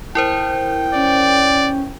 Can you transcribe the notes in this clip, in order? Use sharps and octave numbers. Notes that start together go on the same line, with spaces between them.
E4 A#4 C5 G5
C#4 D5